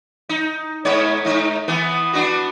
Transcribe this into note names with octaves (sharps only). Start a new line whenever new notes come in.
D#4
G#2 B3 C#5
G#2 D#4
E3 B3
B3 D4 F#4